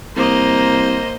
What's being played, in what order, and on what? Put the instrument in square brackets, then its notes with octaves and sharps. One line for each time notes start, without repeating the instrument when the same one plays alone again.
[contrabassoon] C2 [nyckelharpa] A#3 [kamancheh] C5 D#5